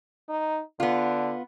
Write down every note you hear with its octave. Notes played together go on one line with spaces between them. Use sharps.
D#4
D3 B3 F4